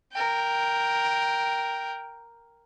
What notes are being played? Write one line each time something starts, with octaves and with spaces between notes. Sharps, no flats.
A#4 G5